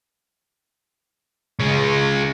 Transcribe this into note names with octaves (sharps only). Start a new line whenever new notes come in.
C#3 G#3